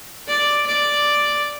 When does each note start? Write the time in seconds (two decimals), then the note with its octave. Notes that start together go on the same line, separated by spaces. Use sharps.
0.28 D5
0.67 D5